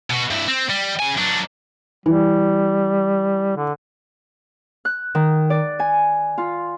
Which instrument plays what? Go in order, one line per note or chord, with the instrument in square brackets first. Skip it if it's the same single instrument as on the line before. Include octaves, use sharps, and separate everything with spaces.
[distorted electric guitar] B2 F#4
G2 E4
C4
G3
C#3 G#5
F#3 D4
[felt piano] E3 [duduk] G3
[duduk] D3
[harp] F#6
D#3
D5
G#5
F4